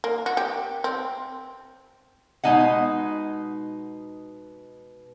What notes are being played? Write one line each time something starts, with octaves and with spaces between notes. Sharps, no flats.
A#3
F#4
G4
C4
B2 G#3 D#4 D#5 F#5